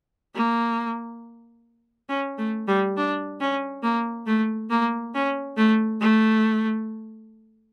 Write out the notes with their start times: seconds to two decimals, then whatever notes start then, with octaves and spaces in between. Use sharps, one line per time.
0.35 A#3
2.09 C#4
2.38 A3
2.67 G3
2.97 D4
3.40 C#4
3.83 A#3
4.26 A3
4.70 A#3
5.14 C#4
5.57 A3
6.01 A3